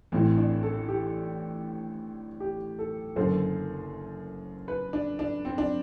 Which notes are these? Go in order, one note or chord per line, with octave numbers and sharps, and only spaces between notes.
A1 A2 E3 C4
D4
A4
G4
G4
A4
F#1 F#2 D3 C5
B4
D4
D4
C4
D4